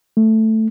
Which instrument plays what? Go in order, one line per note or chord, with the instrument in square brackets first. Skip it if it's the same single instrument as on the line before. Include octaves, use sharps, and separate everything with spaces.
[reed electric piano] A3